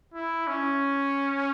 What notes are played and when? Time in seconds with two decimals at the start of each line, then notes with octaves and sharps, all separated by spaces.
0.14 E4
0.47 C#4